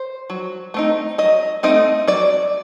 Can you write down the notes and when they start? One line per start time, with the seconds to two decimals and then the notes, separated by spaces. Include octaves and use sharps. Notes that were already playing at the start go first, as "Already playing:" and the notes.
Already playing: C5
0.30 F#3
0.74 A3 C4 D#4
1.18 F#3 D#5
1.63 A3 C4 D#4 D#5
2.08 F#3 D5